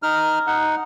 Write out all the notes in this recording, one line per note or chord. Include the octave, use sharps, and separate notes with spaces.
D#4 F6
D#4 F#5